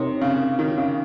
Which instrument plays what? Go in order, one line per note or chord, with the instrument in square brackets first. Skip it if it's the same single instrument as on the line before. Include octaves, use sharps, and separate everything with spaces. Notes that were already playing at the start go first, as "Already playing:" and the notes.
Already playing: [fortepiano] C3 [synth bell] C4 D#4 A#4 C#5
[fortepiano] C#3
D#3
C#3